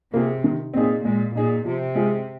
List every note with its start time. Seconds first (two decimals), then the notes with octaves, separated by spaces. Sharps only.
0.13 C3 A#3 F4 G#4
0.44 D#3
0.74 A#2 C4 D#4 G#4
1.04 A#2 G#3
1.35 A#2 D#4 G#4
1.65 C3 F3
1.95 G#3 F4 G#4